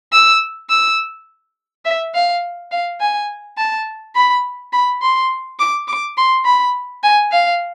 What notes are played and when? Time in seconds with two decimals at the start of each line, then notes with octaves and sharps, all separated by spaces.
0.13 E6
0.69 E6
1.85 E5
2.14 F5
2.71 F5
3.00 G#5
3.57 A5
4.15 B5
4.73 B5
5.02 C6
5.59 D6
5.88 D6
6.17 C6
6.45 B5
7.03 G#5
7.32 F5